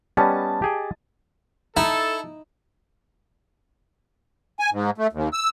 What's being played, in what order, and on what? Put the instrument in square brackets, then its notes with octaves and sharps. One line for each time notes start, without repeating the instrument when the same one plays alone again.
[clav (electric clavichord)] G3 B3 C#4 [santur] D#5 A5
[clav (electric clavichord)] G4 G#4 G5
[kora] D#4 [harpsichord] E4 [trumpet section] A4
[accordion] G#5
G#2
A3
D#2
E6